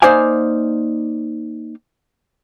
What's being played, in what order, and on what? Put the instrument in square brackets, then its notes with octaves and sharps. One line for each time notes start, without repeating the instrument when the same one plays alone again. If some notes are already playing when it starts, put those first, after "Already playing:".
[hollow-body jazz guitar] A#3 D#4 C5 D5 F5 G#5